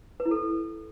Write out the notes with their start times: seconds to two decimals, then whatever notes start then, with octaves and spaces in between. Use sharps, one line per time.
0.20 B4
0.25 E4
0.31 A4